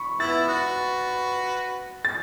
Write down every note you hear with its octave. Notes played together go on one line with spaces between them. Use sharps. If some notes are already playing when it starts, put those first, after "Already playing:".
Already playing: B5 C#6
B3 E4 A6
F#4 B4
A6